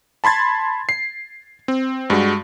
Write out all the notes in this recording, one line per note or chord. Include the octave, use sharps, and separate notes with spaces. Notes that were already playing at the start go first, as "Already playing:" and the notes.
A5 B5 C6 G#6 A6
C7
C4
G2 G3 G#3 F#4